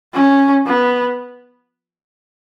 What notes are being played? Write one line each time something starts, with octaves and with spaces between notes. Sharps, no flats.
C#4
B3